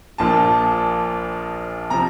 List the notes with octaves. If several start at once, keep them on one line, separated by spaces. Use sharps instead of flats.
A#1 A#2 F3 A5
C3 F3 A#5